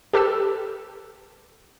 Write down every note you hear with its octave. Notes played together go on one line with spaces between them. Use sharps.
G4 A4 B4 E6